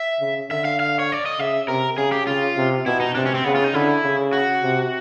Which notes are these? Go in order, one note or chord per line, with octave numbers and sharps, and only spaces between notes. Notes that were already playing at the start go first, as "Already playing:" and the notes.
Already playing: E5
C#3
D3 E5
F5
F5
C#5
D5
D#5
C#3 E5
C3 A#4
C#3 G#4
G4
C#3 F4
C3
B2 E4
D#4
C3 D4
C#4
C4
C#3 B3
F4
D#4
D3 E4
C#3
F#4
C3